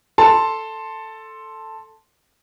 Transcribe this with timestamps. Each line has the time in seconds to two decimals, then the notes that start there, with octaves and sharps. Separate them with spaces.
0.18 A4 A5 C6